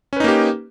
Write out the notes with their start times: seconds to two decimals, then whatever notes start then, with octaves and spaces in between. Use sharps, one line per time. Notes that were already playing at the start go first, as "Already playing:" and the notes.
0.13 C#4
0.16 B4
0.20 D#4
0.24 A#3
0.28 G4